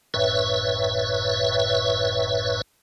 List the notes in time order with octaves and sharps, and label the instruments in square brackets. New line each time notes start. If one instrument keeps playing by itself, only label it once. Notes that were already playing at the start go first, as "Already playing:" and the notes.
[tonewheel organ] G1 F#2 A2 B4 C#5 E5